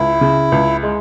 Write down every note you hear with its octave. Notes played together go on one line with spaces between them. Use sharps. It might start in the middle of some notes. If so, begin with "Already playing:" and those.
Already playing: C#2 E4
C#3
C#2
G#3